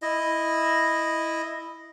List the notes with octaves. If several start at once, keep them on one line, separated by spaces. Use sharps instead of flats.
E4 D#5